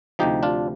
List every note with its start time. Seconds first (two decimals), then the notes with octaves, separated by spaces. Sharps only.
0.19 D2 C3 F3 D#4 G4
0.43 D4 F4